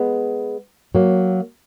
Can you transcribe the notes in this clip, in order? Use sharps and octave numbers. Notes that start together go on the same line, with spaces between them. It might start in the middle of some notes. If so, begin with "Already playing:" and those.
Already playing: G#3 B3
F#3 A#3